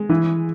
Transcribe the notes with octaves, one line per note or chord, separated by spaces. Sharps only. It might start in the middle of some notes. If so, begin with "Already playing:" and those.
Already playing: G#3
E3